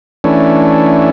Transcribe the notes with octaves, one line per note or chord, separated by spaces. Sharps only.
E3 A3 C#4 D4